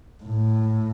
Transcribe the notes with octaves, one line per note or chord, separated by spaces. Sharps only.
A2